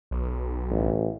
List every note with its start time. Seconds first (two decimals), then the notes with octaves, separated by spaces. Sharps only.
0.11 B1
0.70 A1